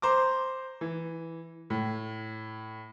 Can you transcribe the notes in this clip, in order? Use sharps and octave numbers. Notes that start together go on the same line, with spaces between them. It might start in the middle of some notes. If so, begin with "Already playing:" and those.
C5 A#5 D6
E3
A2